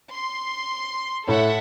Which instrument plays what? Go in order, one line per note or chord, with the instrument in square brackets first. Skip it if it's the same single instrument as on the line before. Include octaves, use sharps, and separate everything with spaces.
[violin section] C6
[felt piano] A2 C#5 [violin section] A4 E5 F#5